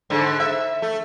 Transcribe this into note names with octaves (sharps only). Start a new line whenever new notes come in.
G#2 D3
E5
A3